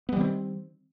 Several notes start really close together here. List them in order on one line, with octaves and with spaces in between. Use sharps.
B3 G3 D#3 C4